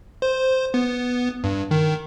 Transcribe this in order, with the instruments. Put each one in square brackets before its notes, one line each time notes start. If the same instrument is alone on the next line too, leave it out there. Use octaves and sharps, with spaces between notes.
[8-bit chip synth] C5
B3
G2
D#3